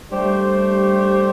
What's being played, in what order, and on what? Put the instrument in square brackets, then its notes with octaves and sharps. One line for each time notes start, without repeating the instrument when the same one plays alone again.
[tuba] G3 [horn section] A3 D4 G4 C5